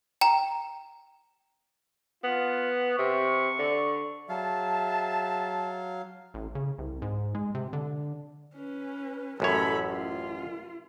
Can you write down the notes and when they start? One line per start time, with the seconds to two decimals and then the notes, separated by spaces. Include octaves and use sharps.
0.21 G5 A#5
2.24 B3 F4
2.98 C3 C#6
3.59 D3
4.29 F#3 G#4 E5 F5 A5
6.34 A1
6.55 C#3
6.78 C2
7.02 G#2
7.35 G#3
7.55 C3
7.73 D3
8.55 C#4 B4
9.40 A1 F#2 A4 C#5 B5
9.91 F4